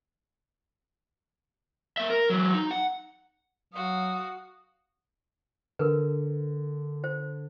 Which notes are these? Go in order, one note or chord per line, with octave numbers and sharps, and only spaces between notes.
A#3 E5
A#4
E3 F#3
D#4
F#5
F#3 F#4 F5 D#6
D3 A#4 B4
C5